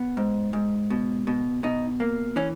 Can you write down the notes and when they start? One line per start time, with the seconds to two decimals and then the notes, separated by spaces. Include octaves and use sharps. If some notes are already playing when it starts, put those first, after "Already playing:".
Already playing: B3
0.17 G#2
0.53 G#2
0.90 B2
1.27 B2
1.63 B2 D#4
2.00 A#3
2.36 E3 C#4